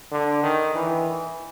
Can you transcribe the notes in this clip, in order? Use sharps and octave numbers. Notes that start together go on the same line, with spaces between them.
D3
D#3
E3